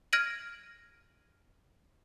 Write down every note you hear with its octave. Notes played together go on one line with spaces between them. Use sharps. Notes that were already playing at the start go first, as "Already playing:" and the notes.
F6 G#6 A#6 D7 D#7 F#7